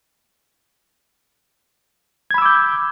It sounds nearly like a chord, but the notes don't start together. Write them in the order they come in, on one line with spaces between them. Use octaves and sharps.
G#6 B5 E6 D6 G6